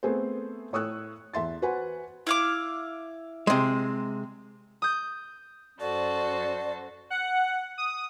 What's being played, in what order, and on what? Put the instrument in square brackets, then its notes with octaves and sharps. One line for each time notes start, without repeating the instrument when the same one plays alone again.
[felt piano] A3 B3 C4 G#4 A4 C5
A2 C#5 C#6 D#6 E6 F#6
E2 E5 C6 A6
F#4 B4 C5 F#5 G#5
[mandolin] E4 F5 D6
[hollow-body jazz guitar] C3 G#3
[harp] D#6 G6
[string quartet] F#2 F#4 C5 [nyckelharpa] A4 A5 [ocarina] D5
[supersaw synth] F#5
D#6